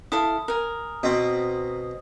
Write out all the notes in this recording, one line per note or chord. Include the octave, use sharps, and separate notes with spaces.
E4 A4 F5 D#6
A#4 G#5
B2 C4